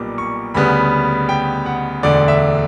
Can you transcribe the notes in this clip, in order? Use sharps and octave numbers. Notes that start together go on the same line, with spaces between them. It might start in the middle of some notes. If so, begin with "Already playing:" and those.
Already playing: B1 A#2 G3 B3 D6
C#6
D2 C#3 G3 B3 B5
G5
F#5
E1 D2 D3 D5
E5